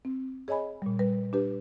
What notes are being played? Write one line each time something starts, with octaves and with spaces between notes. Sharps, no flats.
C4
G#4 C#5 D#5 G#5 B5
A#2 G3
G3 B4
D4 G4 B4